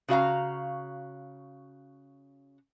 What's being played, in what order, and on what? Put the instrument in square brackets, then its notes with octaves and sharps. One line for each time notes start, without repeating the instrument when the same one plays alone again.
[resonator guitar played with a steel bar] C#3 F#4 F5 A#5